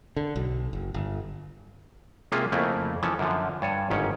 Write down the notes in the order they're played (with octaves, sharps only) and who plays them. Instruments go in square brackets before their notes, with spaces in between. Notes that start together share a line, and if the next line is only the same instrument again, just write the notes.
[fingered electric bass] D3
B1
F#1
G1
[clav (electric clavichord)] C3 G#3 A#3 C#4 F4 G#4
F2 C#3 A3 A#3 E4
E3 F3 C#4 A4
F#2 D3 F3
G2 C#5 G#5 A5
G1 G#2 D#3 C#4 C#5